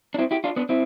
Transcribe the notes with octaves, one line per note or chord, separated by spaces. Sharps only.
D4
C4 E4
E4 G4
D4 F4
B3 D4
C4 E4